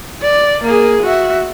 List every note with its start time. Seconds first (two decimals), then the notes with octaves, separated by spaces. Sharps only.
0.22 D5
0.64 A#3 G#4
1.03 F#4 E5